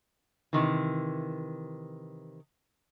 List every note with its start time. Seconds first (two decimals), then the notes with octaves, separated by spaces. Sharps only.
0.53 C3 D#3 E3